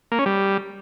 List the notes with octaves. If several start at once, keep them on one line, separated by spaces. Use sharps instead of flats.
A#3
C#4
G3